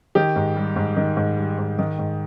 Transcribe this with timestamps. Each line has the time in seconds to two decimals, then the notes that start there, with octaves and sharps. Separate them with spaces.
0.15 D#3 G4
0.36 G#2
0.56 G3
0.76 G#2
0.97 D#3
1.17 G#2
1.38 G3
1.58 G#2
1.79 D#3
1.99 G#2